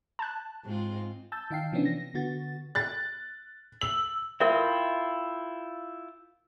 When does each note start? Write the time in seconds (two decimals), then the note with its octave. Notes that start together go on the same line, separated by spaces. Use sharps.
0.19 A5 F#6
0.64 G#2 C4 F4
1.32 A5 E6 G6 A6
1.51 D#3 D#4 F5 G5 C7
1.72 C3 E3 F3 B3 C#4 D4
1.85 A#6
2.14 D3 B3 F#4 A6
2.75 F#6 A6
3.81 E6 F#7
4.40 E4 F4 A#4 E5 G5